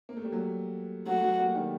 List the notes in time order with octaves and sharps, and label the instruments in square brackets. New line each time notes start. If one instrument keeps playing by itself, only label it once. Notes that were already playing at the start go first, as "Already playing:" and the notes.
[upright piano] A#3
A3
G3
F#3 A3
[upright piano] F#3 A3 [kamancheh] F#4
[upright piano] F#3 A3
G3 A#3
D#3 G3